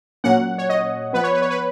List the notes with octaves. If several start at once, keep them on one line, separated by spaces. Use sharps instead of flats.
A#2 F#3 A#3 C#4 F#5
C#5
D#5
F3 B3 B4
C#5
B4
C#5
B4